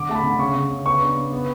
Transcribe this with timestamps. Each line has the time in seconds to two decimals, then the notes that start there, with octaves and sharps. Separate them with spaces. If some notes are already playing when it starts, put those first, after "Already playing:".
Already playing: D3 D6
0.09 A3 A5
0.15 B5
0.23 D3
0.39 C#3 C#6
0.55 C#3
0.70 C#3
0.86 B3 C#6
1.01 D4
1.17 C#3
1.32 B3